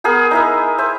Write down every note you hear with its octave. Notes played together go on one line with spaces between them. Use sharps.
B3 G#4 A#4 G5
D#4 E4 A#4
C5 E5